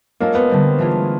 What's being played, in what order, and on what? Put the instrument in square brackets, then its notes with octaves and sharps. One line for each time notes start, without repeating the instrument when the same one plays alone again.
[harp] G#3 C#4 F4 A4 C#5 [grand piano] A#3
[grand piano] B3
[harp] D3 G3 C4
E3 A3 D4 F4 G#4